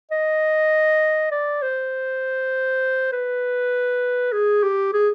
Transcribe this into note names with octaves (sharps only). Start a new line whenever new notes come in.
D#5
D5
C5
B4
G#4
G4
G#4